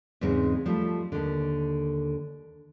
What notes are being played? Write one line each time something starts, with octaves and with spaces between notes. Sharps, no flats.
E2 G#2 C#3 G#3 C4 D#4
F3 G3 A3
D#2 D3